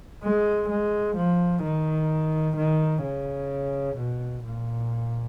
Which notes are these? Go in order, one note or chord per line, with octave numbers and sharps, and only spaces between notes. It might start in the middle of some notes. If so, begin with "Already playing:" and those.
G#3
G#3
F3
D#3
D#3
C#3
B2
A#2